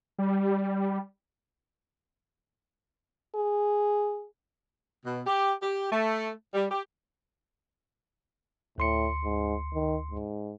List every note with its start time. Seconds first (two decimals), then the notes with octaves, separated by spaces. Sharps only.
0.18 G3
3.35 G#4
5.05 B2
5.27 G4
5.63 G4
5.92 A3
6.54 G3
6.71 G4
8.78 D2 A2 C6 C#7
9.24 G#2
9.74 D#3
10.11 G#2